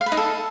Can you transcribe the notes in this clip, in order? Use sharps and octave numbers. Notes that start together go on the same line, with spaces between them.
F5
B4
D#4
A4